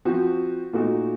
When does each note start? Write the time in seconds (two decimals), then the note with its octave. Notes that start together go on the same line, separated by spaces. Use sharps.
0.05 F3 C4 F#4
0.73 A#2 A3 D#4 F#4